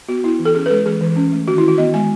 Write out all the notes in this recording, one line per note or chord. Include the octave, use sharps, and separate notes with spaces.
B3 F#4
B3 E4
E3
A4
C#4 G#4
B4
G#3 A4
E3 G#4
E3
C#4
A3
D#3 F#4
E4
D#3 F#4
B3 D#5
G#3 G#5